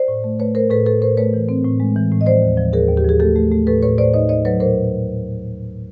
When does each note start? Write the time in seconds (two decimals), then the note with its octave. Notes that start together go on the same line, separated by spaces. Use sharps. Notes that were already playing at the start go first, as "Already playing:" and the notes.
Already playing: C5 D5
0.08 A2
0.24 A3
0.39 A3 B4 C#5
0.55 A3 A#4 C5
0.70 A2 A4 B4
0.86 A2 A4 B4
1.02 A2 A#4 C5
1.17 A3 B4 C#5
1.34 E3
1.49 C4
1.64 A2
1.80 G#3
1.96 E3
2.11 A2
2.21 D#5
2.26 F3 C5 D5
2.42 D#2
2.58 F3
2.73 D#2 G#4 A#4
2.89 D#2
2.97 G4
3.05 F3 G#4
3.20 A3 G4 A4
3.36 A3
3.52 A3
3.67 A2 A4 B4
3.82 A2 B4 C#5
3.98 A2 C5 D5
4.13 D#4 C#5 D#5
4.29 D#4 C#5 D#5
4.45 F#3 B4 C#5
4.60 A#2 A#4 C5